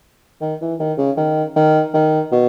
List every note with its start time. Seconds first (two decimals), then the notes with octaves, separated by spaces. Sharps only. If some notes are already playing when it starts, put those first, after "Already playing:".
0.41 D#3
0.61 E3
0.79 D#3
0.98 C#3
1.17 D#3
1.56 D#3
1.93 D#3
2.31 B2